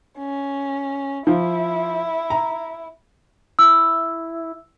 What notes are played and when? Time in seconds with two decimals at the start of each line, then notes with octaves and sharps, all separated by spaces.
0.18 C#4
1.27 F3 E4
2.30 A#5
3.59 E4 E6